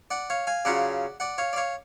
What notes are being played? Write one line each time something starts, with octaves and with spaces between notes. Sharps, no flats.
D5 F#5
C#5 F5
F5 G#5
C#3 F#3 C#4 F4 D5 F#5
D5 F#5
C#5 F5
D5
C#5 F5